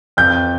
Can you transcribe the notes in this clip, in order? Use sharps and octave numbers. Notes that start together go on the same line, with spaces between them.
F2 G6